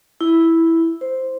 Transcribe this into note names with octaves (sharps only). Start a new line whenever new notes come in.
E4
C5